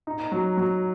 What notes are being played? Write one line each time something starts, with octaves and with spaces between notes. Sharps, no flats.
D#4
F#3
F#3